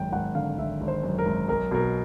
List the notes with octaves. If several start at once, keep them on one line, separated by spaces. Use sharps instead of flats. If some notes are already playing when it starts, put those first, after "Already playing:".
Already playing: G#1 F#2 G5
G#1 F#5
D3 F5
G#1 E5
G#1
C5
F#2
A#4
G#1
B1 A#4
B2 A#4